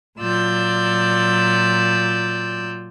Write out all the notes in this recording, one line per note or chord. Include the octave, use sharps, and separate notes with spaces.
A#2 F#3 F4 D5 E6 G6